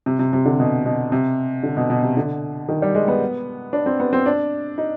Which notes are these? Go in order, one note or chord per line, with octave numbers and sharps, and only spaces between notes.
C3
C3
C3
D3
B2
B2
C3
D3
B2
B2
C3
D3
D#3
G3
G#3
B3
D4
C4
B3
C4
D4
D#4